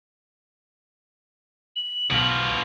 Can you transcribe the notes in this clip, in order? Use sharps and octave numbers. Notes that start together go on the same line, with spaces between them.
F#7
B1 B2 F4